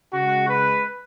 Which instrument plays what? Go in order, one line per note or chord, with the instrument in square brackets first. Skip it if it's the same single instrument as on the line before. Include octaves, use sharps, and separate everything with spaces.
[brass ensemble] C#3 G#3 F#4
B4